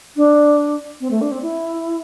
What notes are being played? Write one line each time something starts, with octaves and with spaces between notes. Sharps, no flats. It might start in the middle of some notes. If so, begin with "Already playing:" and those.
D4
C4
A3
D4
C4
E4